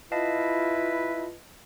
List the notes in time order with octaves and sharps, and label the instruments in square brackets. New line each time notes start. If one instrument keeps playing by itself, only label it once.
[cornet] E4 [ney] F4 [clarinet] B4 [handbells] D#5 F5 A5